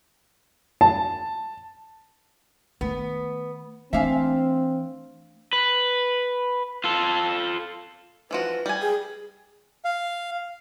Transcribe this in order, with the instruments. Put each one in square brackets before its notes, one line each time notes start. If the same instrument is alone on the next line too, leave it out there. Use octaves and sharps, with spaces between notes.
[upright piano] A5
[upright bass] D#3 A3 [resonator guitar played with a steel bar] B3
[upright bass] E3 [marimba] A3 D4 G#5 [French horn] C4 [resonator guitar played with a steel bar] E5 F5
[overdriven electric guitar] B4
F4 A4
[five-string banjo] E3 F3 F#4 [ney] B4
[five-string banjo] G3 G#5
[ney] G#4
[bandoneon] F5